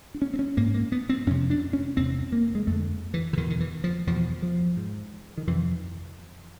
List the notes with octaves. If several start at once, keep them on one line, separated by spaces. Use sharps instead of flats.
D4
C#4
C4
C#4
G#2 A#3
A#3
B3
C4
F2 C3 C#4
D4
C#4
E2 C3 C4
A#3
G#3
F2 A3
D3
E3
D3
E2 B2 D#3
D#3
E3
F3
E2 B2 F3
F3
G#2
D#3
F2 C3 E3